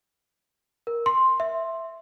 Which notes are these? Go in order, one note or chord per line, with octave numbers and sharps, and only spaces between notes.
A#4
C6
E5